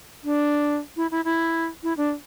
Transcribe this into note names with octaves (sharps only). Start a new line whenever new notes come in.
D4
E4
E4
E4
E4
D4